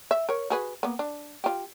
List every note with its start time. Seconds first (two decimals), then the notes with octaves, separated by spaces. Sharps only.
0.11 E5
0.29 A#4 C#5
0.50 F#4 G#4 B4
0.83 A#3 B3
0.99 D4
1.44 F4 G4